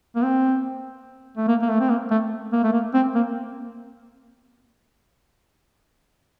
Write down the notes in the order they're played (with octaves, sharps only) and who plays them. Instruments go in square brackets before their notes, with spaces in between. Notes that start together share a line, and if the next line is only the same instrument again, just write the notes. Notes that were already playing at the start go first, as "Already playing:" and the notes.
[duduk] A#3
C4
A3
A#3
A#3
A3
C4
A#3
A3
A#3
A3
A#3
C4
A#3